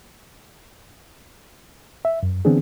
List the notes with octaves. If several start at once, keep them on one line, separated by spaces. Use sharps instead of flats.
E5
F#2
D3 E3 B3 C4 D4 G#4